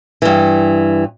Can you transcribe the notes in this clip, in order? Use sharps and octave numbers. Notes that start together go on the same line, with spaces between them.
G2 E3